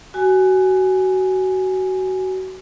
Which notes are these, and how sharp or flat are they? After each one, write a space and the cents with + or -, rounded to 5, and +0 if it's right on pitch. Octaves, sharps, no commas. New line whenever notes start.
F#4 +20 G#5 +0